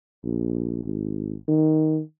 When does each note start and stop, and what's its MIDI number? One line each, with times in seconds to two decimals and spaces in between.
0.24 0.79 34
0.84 1.36 32
1.48 2.00 51